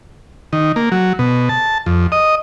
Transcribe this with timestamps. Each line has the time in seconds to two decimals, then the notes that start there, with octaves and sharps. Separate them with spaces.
0.53 D#3
0.76 A#3
0.92 F#3
1.19 B2
1.49 A5
1.86 F2
2.12 D#5